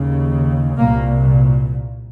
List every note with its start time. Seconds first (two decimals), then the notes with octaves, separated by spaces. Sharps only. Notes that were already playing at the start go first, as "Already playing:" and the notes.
Already playing: D#2 C#3
0.79 C2 A#2 A#3